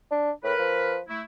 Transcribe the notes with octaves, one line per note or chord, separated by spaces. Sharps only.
D4
A2 A#4 B4
F3
A3 E4